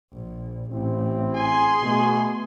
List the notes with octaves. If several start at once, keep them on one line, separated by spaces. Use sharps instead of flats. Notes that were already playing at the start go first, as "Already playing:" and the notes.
A#1
A1 C4 E4
G#4 G#5 C6
B2 A3 G#5